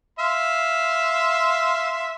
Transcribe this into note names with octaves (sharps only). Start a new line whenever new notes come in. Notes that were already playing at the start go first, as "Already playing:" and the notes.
E5 F5 C6